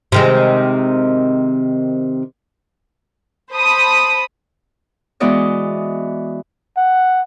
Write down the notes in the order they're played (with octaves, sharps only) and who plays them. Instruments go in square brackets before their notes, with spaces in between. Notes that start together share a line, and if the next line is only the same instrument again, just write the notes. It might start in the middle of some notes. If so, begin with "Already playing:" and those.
[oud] C3 D#3 G#3
[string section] C5 A5 B5 D#6
[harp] E3 G#3 B3 F#4 D5 D#5
[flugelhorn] F#5